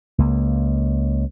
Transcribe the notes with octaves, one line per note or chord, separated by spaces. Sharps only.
C#2 A#3